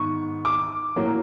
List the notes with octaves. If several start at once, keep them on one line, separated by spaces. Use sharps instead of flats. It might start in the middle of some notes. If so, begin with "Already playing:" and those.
Already playing: G#2 D#3 B3 C#6
D6
A2 F#3 A#3